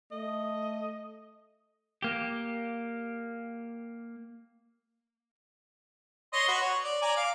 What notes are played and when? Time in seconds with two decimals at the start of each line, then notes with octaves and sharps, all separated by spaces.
0.11 A3 D#5
2.02 A#3 G4
6.33 C#5 D#5 C6
6.48 F#4 B4
6.62 C#5
6.84 D5
7.02 D5 G#5 A#5
7.16 F5 D6